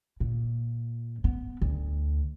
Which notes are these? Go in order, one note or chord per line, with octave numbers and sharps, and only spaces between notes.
A#2
B3
D2